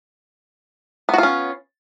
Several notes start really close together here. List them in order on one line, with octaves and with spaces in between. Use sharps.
B3 F#4 F4 C#4